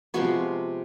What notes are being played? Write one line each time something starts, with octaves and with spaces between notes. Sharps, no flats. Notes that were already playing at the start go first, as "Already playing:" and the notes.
C3 F3 G#3 B3 F#4